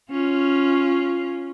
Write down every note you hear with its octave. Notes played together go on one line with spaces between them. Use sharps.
C#4 F4